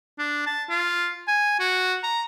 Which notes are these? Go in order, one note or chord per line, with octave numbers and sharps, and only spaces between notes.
D4
A5
F4
G#5
F#4
A#5